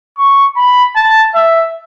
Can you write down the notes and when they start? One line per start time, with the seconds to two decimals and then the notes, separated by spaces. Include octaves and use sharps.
0.17 C#6
0.56 B5
0.96 A5
1.34 E5